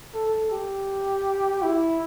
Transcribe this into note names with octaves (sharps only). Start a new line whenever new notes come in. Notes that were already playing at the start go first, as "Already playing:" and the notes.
A4
G4
E4